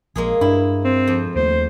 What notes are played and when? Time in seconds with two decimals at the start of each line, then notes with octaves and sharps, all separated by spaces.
0.16 A#1 G#3 A#3 G#4
0.41 G2 D4 E4
0.85 C4
1.07 F2
1.35 D#2 A3 C5